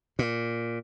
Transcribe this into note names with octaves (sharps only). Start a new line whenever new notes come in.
A#2